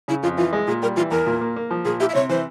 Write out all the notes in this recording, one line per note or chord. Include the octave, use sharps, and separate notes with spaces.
C#3 E4
F2 F4
E3 F4
G#3
A#2 G#4
G3 A#4
E3 F4
E2 A#4
A#2
A#3
A#3
F3
A#2 G#4
E4 G4
E5
C3 C#5
E3 C5